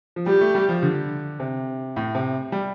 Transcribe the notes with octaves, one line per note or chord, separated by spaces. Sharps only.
F3
G3 G4
A3
G3
F3
D3
C3
A2
C3
G3